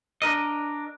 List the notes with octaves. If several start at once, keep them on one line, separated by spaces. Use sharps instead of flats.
D4 A#4 D#5